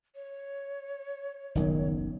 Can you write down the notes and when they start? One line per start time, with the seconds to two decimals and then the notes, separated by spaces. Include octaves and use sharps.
0.15 C#5
1.55 F#1 B1 A#2 D#3